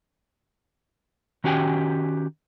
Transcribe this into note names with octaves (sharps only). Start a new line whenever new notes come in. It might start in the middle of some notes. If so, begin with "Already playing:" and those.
D#3 C#4 F#4 G4 G5 G#5